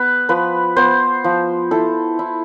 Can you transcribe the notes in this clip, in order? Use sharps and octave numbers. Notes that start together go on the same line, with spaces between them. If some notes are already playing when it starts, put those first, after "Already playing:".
Already playing: B3 B4
F3 B4
B3 C5
F3
E4 A4
E4